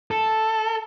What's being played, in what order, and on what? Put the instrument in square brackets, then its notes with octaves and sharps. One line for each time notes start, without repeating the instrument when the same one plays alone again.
[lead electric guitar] A4